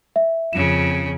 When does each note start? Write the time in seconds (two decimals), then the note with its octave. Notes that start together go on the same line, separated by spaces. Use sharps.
0.16 E5
0.53 F2 C#3 E7